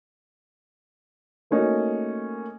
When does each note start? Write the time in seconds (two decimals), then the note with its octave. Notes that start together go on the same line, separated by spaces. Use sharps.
1.51 A3 A#3 C#4 D#4 F#4